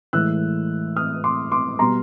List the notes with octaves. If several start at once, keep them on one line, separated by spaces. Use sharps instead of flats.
A2 E3 G#3 E6 F#6
D#6 F6
C6 D6
C6 D6
B2 G3 B3 A#5 C6